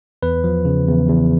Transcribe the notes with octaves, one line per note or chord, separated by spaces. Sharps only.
E2 B4
F3
C#3
E2
E2